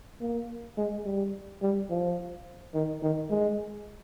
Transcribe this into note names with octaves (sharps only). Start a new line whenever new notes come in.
A#3
G#3
G3
G3
F3
D#3
D#3
G#3